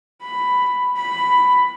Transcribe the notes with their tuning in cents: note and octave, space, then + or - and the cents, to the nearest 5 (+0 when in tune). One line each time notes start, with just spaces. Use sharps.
B5 +5
B5 +5